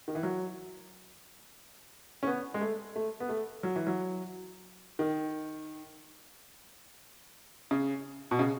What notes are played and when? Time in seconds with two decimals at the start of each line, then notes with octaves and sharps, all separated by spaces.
0.08 D#3
0.15 E3
0.23 F#3
2.23 C#4
2.27 B3
2.54 G#3
2.61 A3
2.96 A3
3.20 B3
3.29 A3
3.63 F#3
3.76 E3
3.87 F#3
4.99 D#3
7.71 C#3
8.31 B2
8.39 C#3